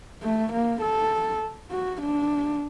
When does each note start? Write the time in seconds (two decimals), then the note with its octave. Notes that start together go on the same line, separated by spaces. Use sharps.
0.23 A3
0.52 A#3
0.81 A4
1.71 F#4
2.01 D4